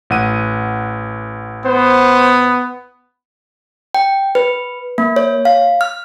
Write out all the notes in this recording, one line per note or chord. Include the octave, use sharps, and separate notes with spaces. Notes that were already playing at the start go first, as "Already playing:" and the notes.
A1 F#5 D#7
B3 C5
G5
B4
A#3
C#5
F5
F6